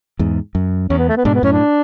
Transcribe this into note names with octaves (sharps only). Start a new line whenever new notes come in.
E2 G#2
F#2
E2 C#4
B3
A3
B3
G#2 B2 D4
B3
F#2 A2 C#4
D4